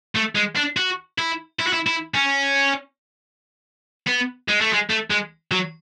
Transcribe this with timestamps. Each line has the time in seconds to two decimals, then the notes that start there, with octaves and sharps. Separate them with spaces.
0.15 A3
0.35 G#3
0.56 D4
0.77 F#4
1.18 E4
1.59 E4
1.67 F#4
1.73 E4
1.87 E4
2.14 C#4
4.07 B3
4.48 G#3
4.61 A3
4.73 G#3
4.90 A3
5.10 G#3
5.51 F#3